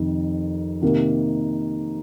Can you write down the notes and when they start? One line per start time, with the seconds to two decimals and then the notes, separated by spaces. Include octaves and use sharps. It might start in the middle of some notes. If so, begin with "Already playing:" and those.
Already playing: F2 C3 D#3
0.82 C3 D#3 A#3